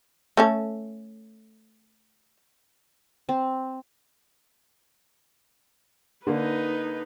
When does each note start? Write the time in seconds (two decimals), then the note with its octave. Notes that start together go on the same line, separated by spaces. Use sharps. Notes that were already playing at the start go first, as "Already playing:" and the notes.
0.37 A3 C#4 A4
3.29 C4
6.27 D3 A#3 D#4 B4